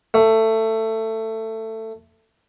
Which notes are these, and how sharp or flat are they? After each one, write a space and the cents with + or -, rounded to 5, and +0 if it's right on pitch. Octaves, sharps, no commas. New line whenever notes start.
A3 +15